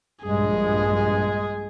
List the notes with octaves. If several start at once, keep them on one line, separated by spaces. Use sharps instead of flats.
A#1 G2 G#3 G#4